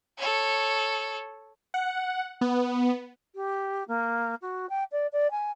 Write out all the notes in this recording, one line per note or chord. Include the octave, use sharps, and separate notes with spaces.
A4 C#5
F#5
B3
G4
A#3
F#4
G5
D5
D5
G#5